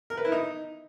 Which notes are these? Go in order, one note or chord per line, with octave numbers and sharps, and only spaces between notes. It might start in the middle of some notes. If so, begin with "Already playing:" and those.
A#4
B4
E4
D#4